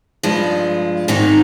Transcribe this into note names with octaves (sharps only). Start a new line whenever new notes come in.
G2 F3 G#3
G#2 D#3 G#3 C4 D#4